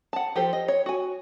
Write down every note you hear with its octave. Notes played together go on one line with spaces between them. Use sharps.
F#5 A5
F3 G4 A4 C5
D#5
C#5
F#4 G#5